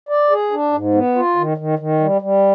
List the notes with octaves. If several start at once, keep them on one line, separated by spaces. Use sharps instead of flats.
D5
G#4
D4
G#2
B3
F4
D#3
D#3
D#3
G3
G3